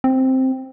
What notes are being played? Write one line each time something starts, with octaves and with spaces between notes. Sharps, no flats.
C4